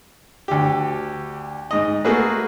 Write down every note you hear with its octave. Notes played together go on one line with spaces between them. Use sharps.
D2 G4
G#2 D#5
A3 A#3 F#4 G#4 B4